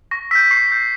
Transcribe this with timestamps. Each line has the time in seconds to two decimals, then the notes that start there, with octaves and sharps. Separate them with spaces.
0.11 C#6 A#6
0.31 E6 B6
0.35 G6
0.51 C#6 C7
0.70 E6 G6